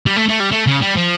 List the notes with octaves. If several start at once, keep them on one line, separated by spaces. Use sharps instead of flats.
G3
A3
A3
G3
A3
C#3
G3
F3